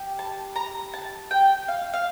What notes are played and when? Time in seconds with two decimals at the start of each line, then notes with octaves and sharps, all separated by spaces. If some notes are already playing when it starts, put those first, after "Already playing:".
Already playing: G4
0.19 A5
0.56 A#5
0.94 A5
1.31 G5
1.68 F5
1.94 F5